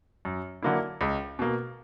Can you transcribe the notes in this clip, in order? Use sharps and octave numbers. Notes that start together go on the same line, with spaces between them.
F#2
D3 F#3 A#3 E4
C#2
B2 A#3